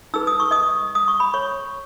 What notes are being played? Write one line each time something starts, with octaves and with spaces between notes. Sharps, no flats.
D#4 G#4 B4 E6
D#6
C#6
D#5 D#6
D#6
C#6
B5
C#5 C#6